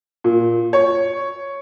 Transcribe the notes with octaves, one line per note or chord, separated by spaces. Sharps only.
A#2
C#5